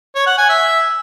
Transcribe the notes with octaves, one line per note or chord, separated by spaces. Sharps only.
C#5
F#5
G#5
E5